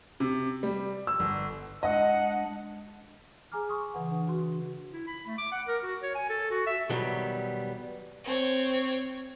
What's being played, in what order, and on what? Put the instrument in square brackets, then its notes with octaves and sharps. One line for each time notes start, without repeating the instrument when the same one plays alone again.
[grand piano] C3
G3
E6
G1
[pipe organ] G#3 D4 [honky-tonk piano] D#5 [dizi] F#5
[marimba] G#4 G#5 A#5 D6 F6
G#5 C6 C#6 D#6
C#3 E3 B4 F#5
D4
F#4 C6
[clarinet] E4
B5
A3
D6
F#5
A#4
F#4
C#5
G#5
A4
F#4
E5
[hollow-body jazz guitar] B2 D#3 F#3 G3 B3
[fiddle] C4 C#5